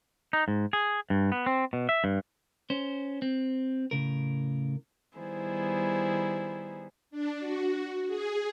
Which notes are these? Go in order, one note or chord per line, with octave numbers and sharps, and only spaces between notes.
D#4
G#2
G#4
G2
B3
C4
B2
E5
G2
C#4 C5
C4
A2 C#3 A#4
D#3 G3 B3 E4 G#4 C5
D4
F#4
G#4